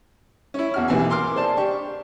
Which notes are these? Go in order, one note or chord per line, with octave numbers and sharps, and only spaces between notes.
C#4 E4
E2 F#4 F6
B1 C3 E3 A#3 G#5 E6
A#4 C6 D6 F6
G#4 C5 D5 A5
D4 G4 C#6